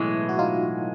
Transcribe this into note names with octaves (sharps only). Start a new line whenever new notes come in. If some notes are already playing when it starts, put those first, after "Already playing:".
Already playing: B1 A2 E3 G#3 E4
F#4
D#4 F4